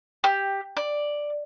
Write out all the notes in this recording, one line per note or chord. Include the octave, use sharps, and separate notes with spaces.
G4
D5